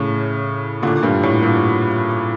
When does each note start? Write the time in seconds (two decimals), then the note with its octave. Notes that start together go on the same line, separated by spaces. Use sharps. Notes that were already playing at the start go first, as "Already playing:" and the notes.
Already playing: A2 C#3
0.82 A#2 D3
1.02 G2 A#2
1.23 A2
1.43 G2 A#2